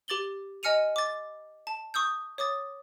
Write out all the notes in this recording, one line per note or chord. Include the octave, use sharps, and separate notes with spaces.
G4 D6 A6 F#7 G7
D#5 G#5 F6 C#7 D#7 F7
D6 A6
A5
C#6 D#6 E6 G6
C#5 D6 D#6 A6